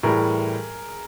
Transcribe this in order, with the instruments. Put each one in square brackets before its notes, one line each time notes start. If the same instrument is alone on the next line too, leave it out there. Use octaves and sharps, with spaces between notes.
[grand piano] A2 E3 G3 G#4 A#4